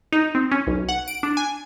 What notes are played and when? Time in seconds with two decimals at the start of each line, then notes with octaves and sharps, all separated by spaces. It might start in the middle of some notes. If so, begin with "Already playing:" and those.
0.12 D#4
0.35 C4
0.52 C#4
0.67 B1
0.89 F#5
1.08 D7
1.23 D4
1.37 G#5